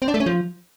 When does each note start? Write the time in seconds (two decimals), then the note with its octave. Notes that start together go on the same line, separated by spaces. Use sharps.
0.02 C4
0.08 D4
0.14 A3
0.20 C#4
0.26 F3